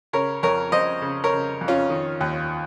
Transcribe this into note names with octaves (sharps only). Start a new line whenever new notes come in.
C#3 A#4 C#5
F2 A#4 C#5
F2 C5 D#5
C#3
A#4 C#5
C#3
F2
C#4 F4
D#3
D#2